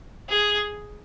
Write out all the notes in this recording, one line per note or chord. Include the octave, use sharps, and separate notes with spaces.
G#4